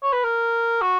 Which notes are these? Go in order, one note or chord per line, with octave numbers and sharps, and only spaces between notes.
C#5
B4
A#4
F#4